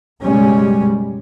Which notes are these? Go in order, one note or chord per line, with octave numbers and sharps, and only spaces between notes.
F#1 B2 G3 G#3 C#4